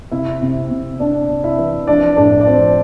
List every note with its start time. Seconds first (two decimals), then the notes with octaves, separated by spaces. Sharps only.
0.11 C3 E4 E5
0.42 C3
0.70 C3
0.99 C3 D4 D5
1.30 C3
1.44 E4 E5
1.58 E3
1.87 F3 D4 D5
2.17 A2 D4 D5
2.41 D5
2.46 F3 C4 C5